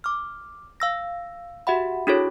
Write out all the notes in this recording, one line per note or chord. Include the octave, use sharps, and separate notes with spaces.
D6 F6
F5 E6 A#6
F#4 G4 E5 F#5 B5
D4 E4 F#4 G#4 A4 C#5